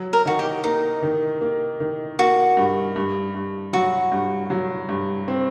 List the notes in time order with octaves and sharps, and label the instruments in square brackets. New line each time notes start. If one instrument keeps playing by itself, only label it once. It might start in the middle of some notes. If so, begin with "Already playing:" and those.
Already playing: [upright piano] F#3
[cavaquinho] A#4
[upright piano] D#3 [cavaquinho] F#4
[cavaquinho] G4
[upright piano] A#3 [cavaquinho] D#4
[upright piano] D#3
A#3
D#3
[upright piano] A#3 [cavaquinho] F#4
[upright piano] G2
G2
G2
[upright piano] F#3 [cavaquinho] F#4
[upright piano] G2
F#3
G2
C4